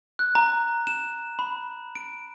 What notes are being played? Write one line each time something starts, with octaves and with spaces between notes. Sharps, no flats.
F#6
A#5
E7
B5
D7